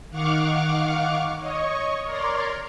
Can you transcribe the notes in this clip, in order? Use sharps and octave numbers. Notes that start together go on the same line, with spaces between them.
D#3 F5 F#5 C#6 D6 F6
C#5 D#5 C#6
A#4 C#5 D5 A#5 C6